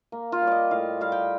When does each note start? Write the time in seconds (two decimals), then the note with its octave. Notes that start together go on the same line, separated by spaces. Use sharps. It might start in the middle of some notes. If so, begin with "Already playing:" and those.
0.12 A#3
0.32 F4
0.42 G3
0.47 D5 D#5
0.71 A2 F5
1.01 G3 F5
1.12 G5